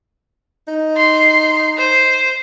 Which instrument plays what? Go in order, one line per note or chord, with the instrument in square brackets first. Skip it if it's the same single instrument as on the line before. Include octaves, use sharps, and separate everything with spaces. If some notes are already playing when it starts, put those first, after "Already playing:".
[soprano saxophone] D#4
[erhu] C6
C5